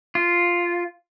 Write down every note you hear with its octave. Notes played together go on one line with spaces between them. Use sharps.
F4